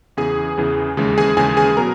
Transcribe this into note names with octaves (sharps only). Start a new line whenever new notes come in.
E2 C#3 E3 G#4 G#5
E2 C#3 E3
D#2 C#3 E3 G#3
G#4 G#5
D#2 C#3 E3 G#3 G#4 G#5
G#4 G#5
B2 F#3 B3 A#4 A#5